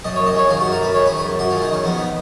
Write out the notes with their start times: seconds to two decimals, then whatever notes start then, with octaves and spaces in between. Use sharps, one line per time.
0.04 F#2 D#5
0.16 F#2 C#5
0.26 D#5
0.34 G#3 C#5
0.49 D#3 F4
0.61 F#2 F#4
0.72 A#4
0.79 F#2 B4
0.94 G#3 C#5
1.06 B4
1.09 D#3
1.17 B4
1.25 F#2
1.39 F#2 F#4
1.50 G#3 F4
1.62 D#4
1.69 D#3 C#4
1.84 F2 B3
1.98 D#4